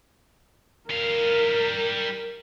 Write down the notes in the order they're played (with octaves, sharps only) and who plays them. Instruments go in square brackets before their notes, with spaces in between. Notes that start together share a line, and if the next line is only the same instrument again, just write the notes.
[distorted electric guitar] G3 F5 [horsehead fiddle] A#4